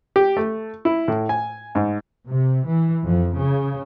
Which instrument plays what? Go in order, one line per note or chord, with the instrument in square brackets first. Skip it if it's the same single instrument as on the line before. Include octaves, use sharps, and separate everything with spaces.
[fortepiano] G4
A3
E4
A2
G#5
G#2
[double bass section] C3
E3
F2
C#3